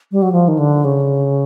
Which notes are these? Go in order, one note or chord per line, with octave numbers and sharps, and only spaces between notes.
G3
F#3
F3
D#3
D3
C#3